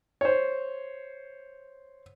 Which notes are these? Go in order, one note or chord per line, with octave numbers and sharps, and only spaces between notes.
C5 C#5